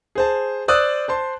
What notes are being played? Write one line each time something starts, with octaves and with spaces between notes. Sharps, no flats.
G#4 C5 A5
C5 D5 D#6 E6 F#6
C5 A5 C6